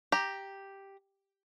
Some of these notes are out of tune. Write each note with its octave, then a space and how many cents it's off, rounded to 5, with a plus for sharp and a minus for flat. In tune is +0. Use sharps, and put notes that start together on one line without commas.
G4 +0 A#5 +5